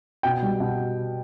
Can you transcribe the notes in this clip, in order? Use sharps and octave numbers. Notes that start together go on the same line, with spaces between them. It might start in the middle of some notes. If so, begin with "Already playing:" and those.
B2 G5
G3
B2